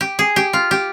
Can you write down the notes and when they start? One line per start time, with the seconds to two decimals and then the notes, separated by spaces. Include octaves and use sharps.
0.01 G4
0.19 G#4
0.36 G4
0.53 F4
0.71 G4